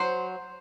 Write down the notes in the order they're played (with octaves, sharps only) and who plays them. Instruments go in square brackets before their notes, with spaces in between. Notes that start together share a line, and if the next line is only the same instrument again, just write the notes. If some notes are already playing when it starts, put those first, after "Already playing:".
Already playing: [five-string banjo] F#3 C5